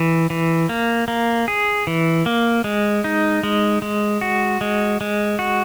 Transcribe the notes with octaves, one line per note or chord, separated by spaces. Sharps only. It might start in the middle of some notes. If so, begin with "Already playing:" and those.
Already playing: E3
E3
A#3
A#3
G#4
E3
A#3
G#3
D#4
G#3
G#3
F#4
G#3
G#3
F#4